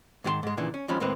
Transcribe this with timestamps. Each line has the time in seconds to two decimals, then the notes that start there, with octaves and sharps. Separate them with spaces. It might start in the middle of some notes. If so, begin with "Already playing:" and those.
0.24 G#2 D#3 F4 F#4 A5 C6
0.43 G#2 G#3
0.57 D#2 A#2 C#3 E3 D4
0.74 C#4
0.88 D#2 D#3 F3 G#3 C#4 B5
1.00 D#2 A2 G#3 A#3 C4 B4